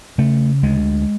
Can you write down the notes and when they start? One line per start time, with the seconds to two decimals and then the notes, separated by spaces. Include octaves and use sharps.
0.18 C#3 A3
0.63 D2 G#3